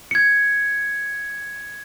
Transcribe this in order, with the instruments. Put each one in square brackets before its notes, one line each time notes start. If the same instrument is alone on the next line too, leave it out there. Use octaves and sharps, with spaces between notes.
[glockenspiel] G#6 C#7